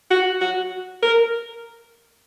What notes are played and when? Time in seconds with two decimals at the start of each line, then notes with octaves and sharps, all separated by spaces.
0.11 F#4
0.41 F#4
1.02 A#4